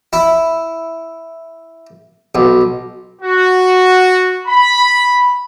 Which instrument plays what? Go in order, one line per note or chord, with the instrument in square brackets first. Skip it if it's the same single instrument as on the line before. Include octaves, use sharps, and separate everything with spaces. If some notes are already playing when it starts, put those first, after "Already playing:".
[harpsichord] E4
B1
[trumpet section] F#4
B5